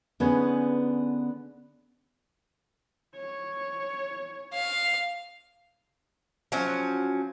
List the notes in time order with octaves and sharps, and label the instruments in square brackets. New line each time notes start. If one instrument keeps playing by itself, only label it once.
[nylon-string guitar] D3 B3 C#4 D#4 G#4 B4
[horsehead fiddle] C#5
[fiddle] F5
[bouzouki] F3 F#3 C#4